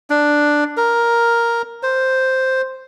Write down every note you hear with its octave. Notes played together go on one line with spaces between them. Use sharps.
D4
A#4
C5